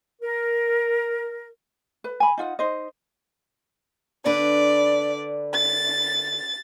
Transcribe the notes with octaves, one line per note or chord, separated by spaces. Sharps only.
A#4
B4
G#5 B5
D#4 F4 F#5
D#4 C5 D#5
D3 D4 B4 D5
A6